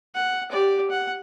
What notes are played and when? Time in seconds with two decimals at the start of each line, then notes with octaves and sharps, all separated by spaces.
0.15 F#5
0.51 G4 D5
0.90 F#5